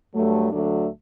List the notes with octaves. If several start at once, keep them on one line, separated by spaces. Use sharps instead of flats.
G2 F#3 A3
D2 D3 F#3 A3 D4